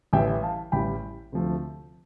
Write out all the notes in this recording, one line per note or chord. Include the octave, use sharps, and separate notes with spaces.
A1 A2 E3 G3 E5 G5
F5 A5
A1 A2 E3 G3 G5 B5
D2 C3 F3 A3